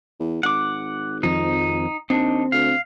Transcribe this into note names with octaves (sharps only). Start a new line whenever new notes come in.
E2
G#1 F#5 D6
F2 D#3 F3 D#4
D#2 C4 D4 D#4
D2 F5